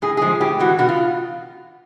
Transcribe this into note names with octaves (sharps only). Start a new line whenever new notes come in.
A2 G#4
F3 G#3 G#4
A2 G4
E3 G#3 F#4
B2 F#4
F4